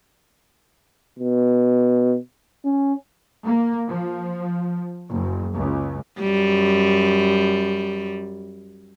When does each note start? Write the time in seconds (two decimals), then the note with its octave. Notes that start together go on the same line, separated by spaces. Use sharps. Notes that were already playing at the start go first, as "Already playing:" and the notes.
1.19 B2
2.65 C#4
3.45 A#3
3.88 F3
5.11 F#1
5.54 C#2
6.20 F#2 G3